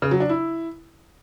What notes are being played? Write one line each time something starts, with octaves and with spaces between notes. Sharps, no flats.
C#3
F#3
D4
E4